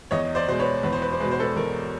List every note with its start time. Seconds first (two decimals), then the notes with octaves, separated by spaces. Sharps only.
0.11 E2 C#5 D#5
0.35 C5 D5
0.48 B2 G#3 C5
0.59 B4 C#5
0.83 E2 B4
0.93 C5
1.02 B4
1.12 C5
1.20 B2 G#3 B4
1.31 C5
1.40 A4 B4
1.56 E2 A#4